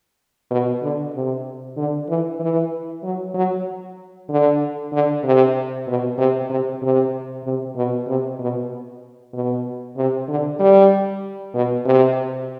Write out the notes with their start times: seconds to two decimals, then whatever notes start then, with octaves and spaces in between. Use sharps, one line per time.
0.51 B2
0.82 D3
1.13 C3
1.76 D3
2.09 E3
2.40 E3
3.03 F#3
3.34 F#3
4.29 D3
4.92 D3
5.24 C3
5.87 B2
6.18 C3
6.50 C3
6.82 C3
7.44 C3
7.76 B2
8.07 C3
8.39 B2
9.33 B2
9.97 C3
10.28 D3
10.59 G3
11.54 B2
11.86 C3